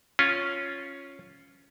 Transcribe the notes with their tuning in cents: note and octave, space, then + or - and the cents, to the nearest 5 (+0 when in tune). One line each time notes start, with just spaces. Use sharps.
C#4 +0 F4 +0